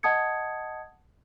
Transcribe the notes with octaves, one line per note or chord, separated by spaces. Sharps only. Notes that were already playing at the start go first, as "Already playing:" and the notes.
D#5 F#5 A5 D#6 G#6 C#7